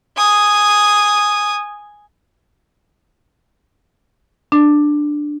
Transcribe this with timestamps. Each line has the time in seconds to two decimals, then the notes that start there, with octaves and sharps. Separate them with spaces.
0.17 G#5 D#6
4.52 D4